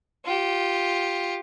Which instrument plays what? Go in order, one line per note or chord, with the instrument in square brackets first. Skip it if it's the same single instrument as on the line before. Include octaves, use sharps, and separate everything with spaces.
[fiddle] F4 G4